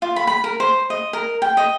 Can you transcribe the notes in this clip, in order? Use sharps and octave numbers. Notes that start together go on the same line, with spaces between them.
F4
B5
B5
A#4
C5
D#5
A#4
G5
D#5